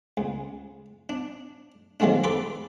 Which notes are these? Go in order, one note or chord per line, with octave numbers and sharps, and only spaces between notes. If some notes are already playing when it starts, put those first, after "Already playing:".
C#2
D4
D#3 F3 F#3 G#3 A3 D4
A4 B4 B5 C6 D6